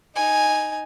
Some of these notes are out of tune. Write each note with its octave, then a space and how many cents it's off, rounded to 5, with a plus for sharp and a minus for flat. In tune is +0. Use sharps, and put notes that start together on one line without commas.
D#4 +0 G#5 +0